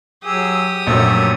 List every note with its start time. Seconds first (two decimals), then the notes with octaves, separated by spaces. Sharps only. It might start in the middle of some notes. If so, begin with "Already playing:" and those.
0.25 F#3 G4 G#4 D#6 E6
0.87 A#1 F#2 F#3 A3 E6